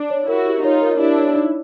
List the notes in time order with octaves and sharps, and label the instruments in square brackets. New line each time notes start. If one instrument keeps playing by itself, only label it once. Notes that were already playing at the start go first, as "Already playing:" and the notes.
Already playing: [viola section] D4
[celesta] C#5
[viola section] E4 F#4 [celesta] A#4
[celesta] G4
[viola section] D#4 F4 [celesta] C#5
[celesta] A#4
[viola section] D4 E4 [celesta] G4
[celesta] C#5
D#4